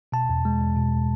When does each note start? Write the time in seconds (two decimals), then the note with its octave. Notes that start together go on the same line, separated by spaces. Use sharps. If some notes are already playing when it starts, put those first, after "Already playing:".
0.12 B2 A5
0.30 E2
0.45 G#3
0.62 E2
0.76 B2